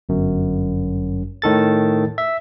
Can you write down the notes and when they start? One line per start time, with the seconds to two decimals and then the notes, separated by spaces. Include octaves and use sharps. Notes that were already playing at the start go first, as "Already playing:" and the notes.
0.09 G1 F#2
1.42 A2 D#3 A4 A6
2.18 E5